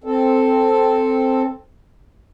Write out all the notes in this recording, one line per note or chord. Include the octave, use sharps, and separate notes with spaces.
C4 A4